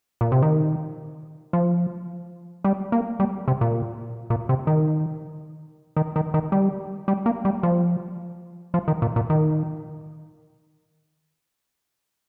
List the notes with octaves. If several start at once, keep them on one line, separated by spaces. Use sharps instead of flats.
A#2
C3
D#3
F3
G3
A#3
G3
C3
A#2
A#2
C3
D#3
D#3
D#3
D#3
G3
G3
A#3
G3
F3
F3
D#3
A#2
A#2
D#3